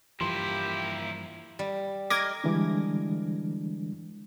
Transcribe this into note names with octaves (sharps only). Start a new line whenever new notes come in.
G2 E3 F3 A#3 E4 G4 C6
G3
A#4 D#5 D6 G#6 A#6
D3 E3 G3 G#3 D4